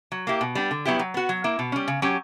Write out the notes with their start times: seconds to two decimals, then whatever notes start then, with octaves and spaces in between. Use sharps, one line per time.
0.12 F#3
0.27 A#3 E4 G4
0.41 B2
0.55 G3 B3 D4
0.71 D3
0.85 F#3 B3 E4 G4
0.99 F#3
1.14 B3 F#4
1.29 F#3
1.44 A#3 E4
1.59 B2
1.72 G3 C#4
1.88 C#3
2.02 F#3 C#4 G4